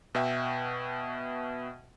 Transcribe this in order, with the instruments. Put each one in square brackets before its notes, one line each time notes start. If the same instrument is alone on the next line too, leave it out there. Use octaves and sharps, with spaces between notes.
[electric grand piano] B2 F#4 E5 G5